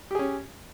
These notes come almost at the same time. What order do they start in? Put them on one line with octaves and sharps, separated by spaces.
G4 G#4 C#4